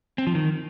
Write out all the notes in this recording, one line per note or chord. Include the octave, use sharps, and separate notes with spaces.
C4
F3
D#3